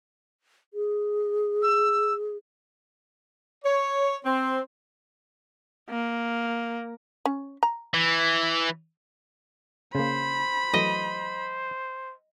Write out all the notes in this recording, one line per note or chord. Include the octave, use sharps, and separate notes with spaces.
G#4
E6
C#5
C4
A#3
C#4
A#5
E3
C#3 A#3 C5 B5
E3 F#3 A3 D#5